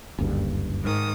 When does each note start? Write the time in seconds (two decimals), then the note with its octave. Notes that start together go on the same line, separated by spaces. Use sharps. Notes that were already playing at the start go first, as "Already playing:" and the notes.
0.18 F#1 D2 G2
0.82 G#2 D#3 D#6